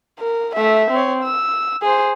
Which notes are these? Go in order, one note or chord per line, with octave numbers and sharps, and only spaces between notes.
A#4
A3 E5
C4 C#5
E6
G#4 C5